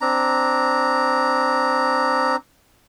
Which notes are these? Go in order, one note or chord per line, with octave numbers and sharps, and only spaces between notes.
C4 D4 A#5